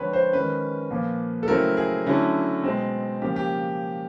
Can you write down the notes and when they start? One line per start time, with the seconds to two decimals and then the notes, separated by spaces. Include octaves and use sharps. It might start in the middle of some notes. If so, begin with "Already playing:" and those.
Already playing: D3 F3 G#3 C4 B4 C#5
0.13 C5
0.33 D#3 G#3 C#4 B4
0.91 A#2 F3 A#3
1.43 A4
1.48 C#3 F#3 A3 C4 E4 A#4
1.77 G#4
2.06 D3 F#3 A3 C#4 E4
2.64 B2 G#3 C4
3.22 C#3 F3 A#3 G4
3.36 G4